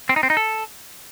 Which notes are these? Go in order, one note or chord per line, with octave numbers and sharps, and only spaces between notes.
C4
D#4
C4
D#4
A4